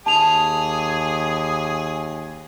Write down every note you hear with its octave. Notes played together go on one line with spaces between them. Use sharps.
D#2 G#4 A5 F7